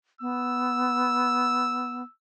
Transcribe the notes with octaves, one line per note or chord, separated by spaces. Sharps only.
B3 E6